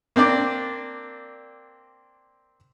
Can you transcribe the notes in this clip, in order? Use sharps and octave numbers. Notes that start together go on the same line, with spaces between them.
A#3 C4 D4 D5